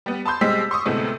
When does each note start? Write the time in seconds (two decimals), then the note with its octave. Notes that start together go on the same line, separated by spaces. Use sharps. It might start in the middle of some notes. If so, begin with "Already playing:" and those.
0.06 G3 B3
0.26 A5 B5 C6 G6
0.41 B2 G3 G#3 C4 E6 B6
0.71 C6 C#6 D#6
0.85 D2 A2 C3 G#3 A3 B3